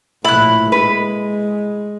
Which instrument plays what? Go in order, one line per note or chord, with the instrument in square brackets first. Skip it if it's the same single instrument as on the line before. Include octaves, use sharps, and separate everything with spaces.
[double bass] A#1 A2 [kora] E4 [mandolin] B5 F#6
[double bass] G#3 [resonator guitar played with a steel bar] B4